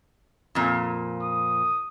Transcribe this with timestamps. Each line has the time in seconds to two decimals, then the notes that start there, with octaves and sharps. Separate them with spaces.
0.55 F2 A#2
1.23 D#6